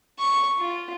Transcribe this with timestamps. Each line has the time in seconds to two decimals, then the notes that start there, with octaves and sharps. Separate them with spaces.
0.19 C#6
0.59 F4